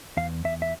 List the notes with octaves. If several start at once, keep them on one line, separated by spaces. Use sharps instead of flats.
E2 F5
E2 E5
E5